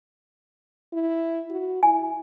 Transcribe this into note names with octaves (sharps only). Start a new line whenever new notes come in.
E4
F#4
E4 G#5